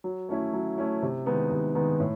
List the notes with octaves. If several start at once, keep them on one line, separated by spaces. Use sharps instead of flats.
F#3
A3 C#4 E4
F#3
A3 C#4 E4
C3
D#3 G#3 B3 D#4
C3
D#3 G#3 B3 D#4
A2